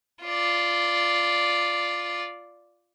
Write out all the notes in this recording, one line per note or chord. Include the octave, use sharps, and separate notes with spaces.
F4 D5